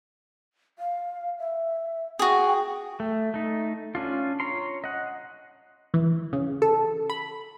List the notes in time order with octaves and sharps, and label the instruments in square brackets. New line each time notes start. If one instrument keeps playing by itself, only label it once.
[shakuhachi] F5
E5
[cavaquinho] F#4 G#4 [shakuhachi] G5
[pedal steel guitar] A3
A3 D#4
C#4 D4 F4
C#5 A#5 C6
D#5 F#5
[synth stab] E3
C#3
A4
B5